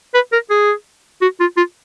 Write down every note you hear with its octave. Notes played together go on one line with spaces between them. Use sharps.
B4
A#4
G#4
F#4
F4
F4